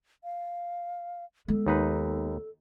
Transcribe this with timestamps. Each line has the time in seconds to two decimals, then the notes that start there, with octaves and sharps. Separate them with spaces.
0.24 F5
1.48 G#3 B3 A4
1.67 D#2 D#4 B4